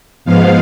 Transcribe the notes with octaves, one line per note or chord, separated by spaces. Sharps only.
G#2 F3 G#3 B3 F5